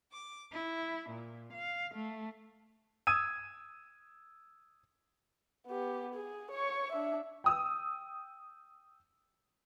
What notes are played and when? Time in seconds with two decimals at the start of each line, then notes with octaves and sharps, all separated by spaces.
0.12 D6
0.52 E4
1.10 A#2
1.53 F5
1.95 A3
3.07 D#6 E6 G#6 D#7
5.67 B3 G4
6.14 G#4
6.51 C#5 C#6
6.92 D4 E5
7.44 G5 D#6 E6